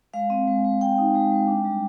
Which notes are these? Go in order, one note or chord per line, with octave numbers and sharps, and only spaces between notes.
G#3 F5
C4
G#3
G#3
G#3 G5
D#4
G#3
G#3
D4
G3